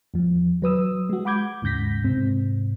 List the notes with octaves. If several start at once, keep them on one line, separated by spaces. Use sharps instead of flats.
E2 F3
F#3 B4 D#6 E6
G#3 F#4
F#5 B5 D6 G6 G#6
D#2 G#2 C#3 G6 A#6 B6
G#2 C3 C4